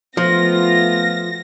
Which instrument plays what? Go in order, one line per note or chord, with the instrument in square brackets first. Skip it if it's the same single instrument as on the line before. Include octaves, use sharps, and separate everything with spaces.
[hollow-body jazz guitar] F3 [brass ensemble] A3 B3 F4 [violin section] A#6